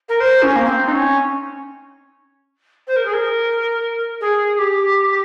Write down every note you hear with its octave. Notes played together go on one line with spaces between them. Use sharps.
A#4
C5
C#4
A#3
C4
D#4
C#4
C5
A#4
G#4
A#4
G#4
G#4
G4